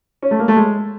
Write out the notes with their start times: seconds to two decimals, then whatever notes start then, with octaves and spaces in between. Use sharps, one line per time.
0.22 C#4
0.31 A3
0.40 A#3
0.48 A3
0.57 G#3